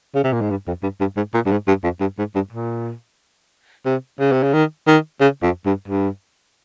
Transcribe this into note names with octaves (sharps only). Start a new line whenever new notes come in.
C#3
C3
A#2
G#2
G2
F2
G2
G2
G#2
A#2
G2
G#2
G2
F2
G2
G#2
G2
A#2
C3
C#3
C3
C#3
D#3
D#3
C#3
F2
G2
G2